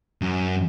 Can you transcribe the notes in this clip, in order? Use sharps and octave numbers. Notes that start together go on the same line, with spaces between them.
F#2